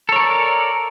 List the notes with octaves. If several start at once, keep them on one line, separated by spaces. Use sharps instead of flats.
A4 A#4 C#5 D5